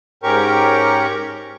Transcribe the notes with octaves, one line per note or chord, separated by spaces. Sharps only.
G#2 C#4 G4 A#4 C#6